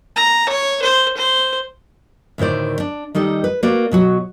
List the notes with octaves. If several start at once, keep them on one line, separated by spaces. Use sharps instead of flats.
A#5
C#5
C5
C5
D2 A2 D#3 C5 D5
D4
D#3 G3 D#4 A4
B4
A#3 F#4 B4 D5
B2 F#3 F#4